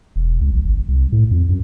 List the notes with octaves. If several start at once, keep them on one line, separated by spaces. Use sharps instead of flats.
E1
C#2
A#1
G1
C2
A2
F2
F#2